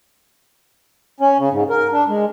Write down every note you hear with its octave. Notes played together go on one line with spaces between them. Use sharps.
C#4
C#3
G#2
A#4
D4
G#3